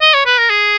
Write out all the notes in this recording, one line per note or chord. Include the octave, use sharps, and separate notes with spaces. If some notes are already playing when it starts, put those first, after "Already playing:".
D#5
C#5
B4
A#4
G#4